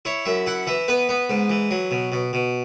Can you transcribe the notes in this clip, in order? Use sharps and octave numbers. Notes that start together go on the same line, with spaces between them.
E4 C#5
F#2 E5
E4 F#5
E3 E5
B3 B4
B3
G#2
E3
F#3
B2
B2
B2